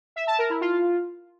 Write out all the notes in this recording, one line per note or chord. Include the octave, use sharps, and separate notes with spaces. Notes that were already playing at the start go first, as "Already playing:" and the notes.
E5
A5
A#4
E4
F4